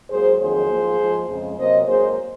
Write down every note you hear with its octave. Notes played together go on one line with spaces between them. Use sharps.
G#2 F#3 A#3 G#4 C5
F2 D#3 F#3 A#3 G#4 C5
G#2 F3 A#3
G#2 F3 G#3
F2 C#3 G#3
C3 F#3 A#3 C5 D#5
G#2 F#3 A#3 G#4 C5